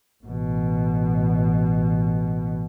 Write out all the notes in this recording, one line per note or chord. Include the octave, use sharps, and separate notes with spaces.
A1 B2